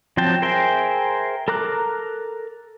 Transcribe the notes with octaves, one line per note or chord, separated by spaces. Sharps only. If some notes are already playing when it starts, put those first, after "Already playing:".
F3 F#3 C4 G5 A5
G#4 A#4 C5 E5 G5
A4 A#4 A#5 D6 F#6